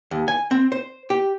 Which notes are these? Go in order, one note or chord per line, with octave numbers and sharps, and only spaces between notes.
D#2
G#5
C4
C5
G4